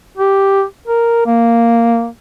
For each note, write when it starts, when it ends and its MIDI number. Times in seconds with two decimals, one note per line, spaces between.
0.18 0.63 67
0.88 1.24 70
1.26 2.07 58